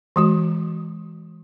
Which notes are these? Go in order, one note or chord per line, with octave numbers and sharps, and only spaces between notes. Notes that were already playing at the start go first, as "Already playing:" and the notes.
E3 G#3 F#4